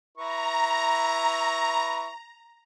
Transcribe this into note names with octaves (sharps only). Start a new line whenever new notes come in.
E4 B4 A#5 C#6